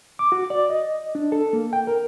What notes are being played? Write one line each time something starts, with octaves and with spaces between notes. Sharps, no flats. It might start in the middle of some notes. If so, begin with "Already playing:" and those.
D6
F#4
D5
D#5
D4
A4
A#3
G5
A#4